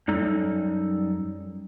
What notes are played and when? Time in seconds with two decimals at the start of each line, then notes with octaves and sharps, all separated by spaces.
0.08 F#2 G3 D#4 A4